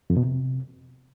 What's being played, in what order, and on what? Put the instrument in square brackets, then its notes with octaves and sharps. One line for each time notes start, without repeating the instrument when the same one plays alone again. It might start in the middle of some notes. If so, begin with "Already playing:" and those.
[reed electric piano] F2
B2
C3